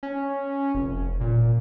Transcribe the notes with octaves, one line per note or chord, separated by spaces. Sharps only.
C#4
F1
A#2